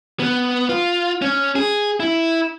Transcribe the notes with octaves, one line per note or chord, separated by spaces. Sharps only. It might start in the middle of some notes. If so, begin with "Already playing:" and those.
B3
F4
C#4
G#4
E4